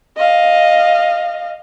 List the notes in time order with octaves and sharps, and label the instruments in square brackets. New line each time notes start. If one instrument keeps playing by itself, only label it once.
[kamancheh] D#5 F5